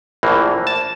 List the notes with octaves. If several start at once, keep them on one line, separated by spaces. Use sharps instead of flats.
A#1 A2 E3 A#3
A5